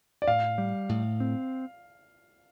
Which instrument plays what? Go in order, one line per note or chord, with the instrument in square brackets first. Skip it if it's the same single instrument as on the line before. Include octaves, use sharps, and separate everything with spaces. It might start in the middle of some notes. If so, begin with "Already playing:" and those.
[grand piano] D5
[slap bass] A2 [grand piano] F5
[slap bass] G3
A2
C4